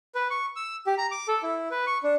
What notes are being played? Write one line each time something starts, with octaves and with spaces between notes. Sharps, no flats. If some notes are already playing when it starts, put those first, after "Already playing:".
B4
C#6
E6
G4
A#5
D6
A4
E4
B4
C#6
D4